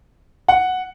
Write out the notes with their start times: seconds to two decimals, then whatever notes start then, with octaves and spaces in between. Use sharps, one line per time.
0.48 F#5